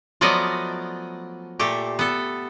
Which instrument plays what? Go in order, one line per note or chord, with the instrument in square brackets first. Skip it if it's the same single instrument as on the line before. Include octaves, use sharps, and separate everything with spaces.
[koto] F3 F#3 A3 B3 D5 D#5
A#2 A3 G4
B3 A4